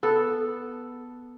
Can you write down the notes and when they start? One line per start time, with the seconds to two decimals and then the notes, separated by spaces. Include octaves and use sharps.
0.03 B3 A4